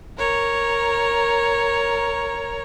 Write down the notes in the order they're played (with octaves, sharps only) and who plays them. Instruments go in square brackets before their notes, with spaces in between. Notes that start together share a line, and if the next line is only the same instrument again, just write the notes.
[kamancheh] A#4 C#5